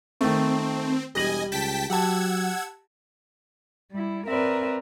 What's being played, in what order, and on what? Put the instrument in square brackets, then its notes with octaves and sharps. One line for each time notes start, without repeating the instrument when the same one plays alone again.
[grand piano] D#3 A3 [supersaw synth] C4
[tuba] E1 [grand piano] G3 A#6 F#7 [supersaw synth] D#5 G#5
[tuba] C#2 [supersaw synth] G5 A5 B6
[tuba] F#3 [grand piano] G4 A5 [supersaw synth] F#5 E6 G#6
[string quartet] G3 E4
C4 A#4 B4 D5 E5